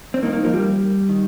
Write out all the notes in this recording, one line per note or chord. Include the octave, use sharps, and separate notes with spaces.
C4
G2 D#3 A#3 D#4
A#3 D#4
F3 A#3
G3
D#3